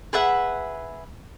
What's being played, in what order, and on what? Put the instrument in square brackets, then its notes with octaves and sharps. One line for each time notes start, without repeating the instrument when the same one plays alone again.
[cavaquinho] G#4 B4 E5 F#5